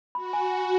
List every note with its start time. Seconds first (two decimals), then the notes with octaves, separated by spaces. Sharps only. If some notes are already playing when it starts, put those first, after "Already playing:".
0.15 F#4 B5
0.33 G#5